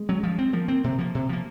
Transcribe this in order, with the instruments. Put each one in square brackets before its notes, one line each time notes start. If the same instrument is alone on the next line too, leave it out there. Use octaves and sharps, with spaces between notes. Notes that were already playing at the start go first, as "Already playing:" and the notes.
Already playing: [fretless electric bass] G#3
[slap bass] F#3 C#4
F3
C4
[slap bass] F3 [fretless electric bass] A#3
[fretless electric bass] A#3 [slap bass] C4
[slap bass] C3
F3 A#3
C3
F3 A#3